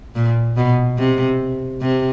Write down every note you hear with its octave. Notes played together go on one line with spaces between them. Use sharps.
A#2
B2
C3
C3